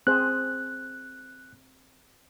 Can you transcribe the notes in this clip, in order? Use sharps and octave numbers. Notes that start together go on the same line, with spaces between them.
C4 G#4 C5 F#6